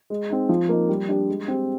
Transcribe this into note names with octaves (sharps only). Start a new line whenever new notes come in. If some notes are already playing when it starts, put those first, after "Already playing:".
G#3
C4 D#4
F3
A#3 D#4
G3
D4 G4
G#3
C4 G4